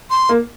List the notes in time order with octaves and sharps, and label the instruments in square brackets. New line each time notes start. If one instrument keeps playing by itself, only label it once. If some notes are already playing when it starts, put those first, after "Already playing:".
[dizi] C6
[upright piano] A#3